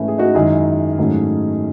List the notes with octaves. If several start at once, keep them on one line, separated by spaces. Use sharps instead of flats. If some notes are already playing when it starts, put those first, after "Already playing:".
Already playing: G#2 E3 A3 C#4 E4
G#4
D#4 F#4
F#2 D#3 G#3 E4 G#4
G#2 D#3 F#3 A3 C#4